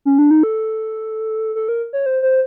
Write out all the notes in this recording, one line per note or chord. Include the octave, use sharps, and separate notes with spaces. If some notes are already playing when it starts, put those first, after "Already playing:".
C#4
D4
D#4
A4
A4
A#4
C#5
C5
C5